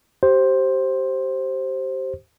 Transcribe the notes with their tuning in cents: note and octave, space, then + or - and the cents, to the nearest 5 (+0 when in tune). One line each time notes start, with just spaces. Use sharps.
G4 -25 C5 +10